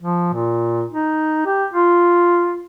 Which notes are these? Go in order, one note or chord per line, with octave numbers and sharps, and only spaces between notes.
F3
A#2
D#4
G4
F4